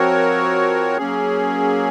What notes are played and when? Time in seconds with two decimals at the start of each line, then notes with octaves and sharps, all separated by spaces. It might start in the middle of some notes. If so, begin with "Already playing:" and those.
Already playing: F3 C4 F#4 A#4 C#5
0.97 F#3 A#3 C#4 G#4